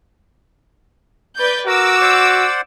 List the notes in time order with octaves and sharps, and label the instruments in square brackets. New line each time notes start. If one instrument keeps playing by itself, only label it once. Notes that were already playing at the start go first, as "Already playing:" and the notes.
[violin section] B4 D5 G6
[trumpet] F#4 [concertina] A#4 [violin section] D6 E6
[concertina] C5 D5 F#5